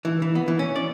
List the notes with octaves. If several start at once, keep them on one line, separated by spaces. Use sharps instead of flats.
E3
E3
B3
E3
C#4
D5